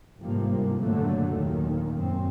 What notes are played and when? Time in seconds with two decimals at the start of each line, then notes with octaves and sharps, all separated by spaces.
0.19 G1 G#2 C3 F3 G3 A#3
0.80 F#1 A#2 D3 F#3 A3
1.30 D#2 A#2 D#3
1.95 F#2 C4